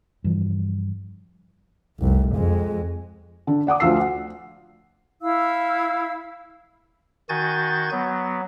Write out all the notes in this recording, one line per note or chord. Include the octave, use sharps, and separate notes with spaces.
G2 C#3 E3 F3
F1 C2
F2 G#3
D3
D5 F#5 D6 D#6
D2 F3 F4 E6 C7
F#5
E4 F5 E6
D#3 F#4 G#5 G6 A6
F#3 B3